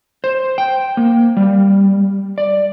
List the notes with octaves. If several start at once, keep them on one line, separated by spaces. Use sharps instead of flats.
C5
G5
A#3
G3
D5